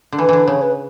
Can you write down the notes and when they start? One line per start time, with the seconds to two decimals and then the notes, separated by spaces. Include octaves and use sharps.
0.12 D3
0.18 E3 B4
0.29 D3 E3
0.47 C#3 C#5
0.62 B4